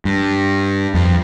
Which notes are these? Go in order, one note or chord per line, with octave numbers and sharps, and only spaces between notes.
G2
F2